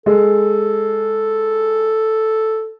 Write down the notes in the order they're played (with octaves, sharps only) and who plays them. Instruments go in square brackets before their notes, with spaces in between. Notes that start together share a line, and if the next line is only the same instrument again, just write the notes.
[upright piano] G#3 [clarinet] A4